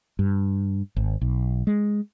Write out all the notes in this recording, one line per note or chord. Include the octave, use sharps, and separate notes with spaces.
G2
G#1
B1
G#3